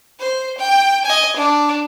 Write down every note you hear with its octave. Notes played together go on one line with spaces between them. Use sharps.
C5
G5
D#5 G#5
D4